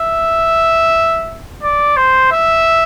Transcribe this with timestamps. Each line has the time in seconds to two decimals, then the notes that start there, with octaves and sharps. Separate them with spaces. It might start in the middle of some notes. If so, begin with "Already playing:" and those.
Already playing: E5
1.63 D5
1.97 C5
2.32 E5